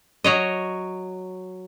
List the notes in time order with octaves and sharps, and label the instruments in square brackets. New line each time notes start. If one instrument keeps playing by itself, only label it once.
[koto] F#3 C#5 D#5